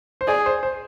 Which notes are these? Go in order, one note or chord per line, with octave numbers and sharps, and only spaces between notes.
C5
G#4 D5
C5
C5